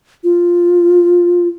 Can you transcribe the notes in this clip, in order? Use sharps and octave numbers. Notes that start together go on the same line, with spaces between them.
F4